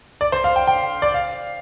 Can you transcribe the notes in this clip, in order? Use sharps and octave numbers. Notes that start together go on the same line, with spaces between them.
D5
C5
F5
G5
G5
D5
F5